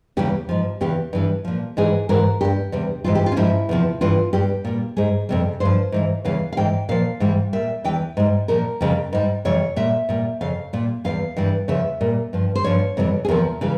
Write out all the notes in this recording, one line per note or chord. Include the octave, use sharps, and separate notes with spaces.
E2 C#3 E3 G3 G4
G#2 F3
E2 C#3 E3 G4
G2 E3 G3
A#2 F3
G#2 E3 G3 G#4
G#2 E3 G3 A#4
G2 G3 G4
E2 C3 G3
G#2 E3 G3 F4
G4
F4
C#4
G#2 F3 E4
E2 C3 F3
G2 E3 G3 F4
G2 G3 G4
A#2 G3
G#2 G3 G#4
F2 C3 G3
G2 F3 C5
G#2 E3 G3
E2 C#3 E3 G3 F5
F5
G#2 E3 G3 G5
A#2 F3 F5
G#2 E3 G3
A#2 G3 E5
E2 E3 G3 G5
G#2 G3
A#2 F3 A#4
F2 C#3 G3
G#2 G3
F2 C3 E3 G3 C#5
A#2 G3 E5
A#2 G3
F2 C#3 F5
A#2 G3
E2 E3 G3 F5
G2 E3 G3
E2 C#3 F3 E5
A#2 G3
G2 F3
C5
G2 F3 C#5
F2 C3 E3 G3
G#4
E2 C3 F3 A#4
C#3 E3 G3